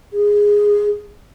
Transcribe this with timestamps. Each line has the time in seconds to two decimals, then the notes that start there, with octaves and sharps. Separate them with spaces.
0.13 G#4